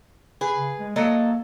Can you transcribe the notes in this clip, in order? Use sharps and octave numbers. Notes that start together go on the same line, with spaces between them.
G#4 B4
C#3
G#3
F#3 A#3 A4 D#5